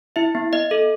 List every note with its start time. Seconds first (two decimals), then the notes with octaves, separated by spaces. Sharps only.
0.16 E4 E5
0.35 B3
0.53 B3 D#5
0.71 A4